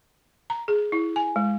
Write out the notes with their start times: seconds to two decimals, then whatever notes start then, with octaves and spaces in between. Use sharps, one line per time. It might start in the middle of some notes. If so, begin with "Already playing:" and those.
0.50 A#5
0.68 G#4
0.92 E4
1.16 G#5
1.36 G#3